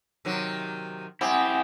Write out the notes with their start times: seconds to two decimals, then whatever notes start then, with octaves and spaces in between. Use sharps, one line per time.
0.25 C3 D#3 F#3
1.21 C4 E4 G4 F#5 G#5 D#6